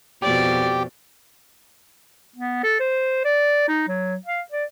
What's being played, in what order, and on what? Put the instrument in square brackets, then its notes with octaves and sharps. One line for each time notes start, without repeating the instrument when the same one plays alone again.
[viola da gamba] F2 B2 [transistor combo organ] G4 [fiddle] D5
[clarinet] B3
A4
C5
D5
D#4
F#3
F5
D5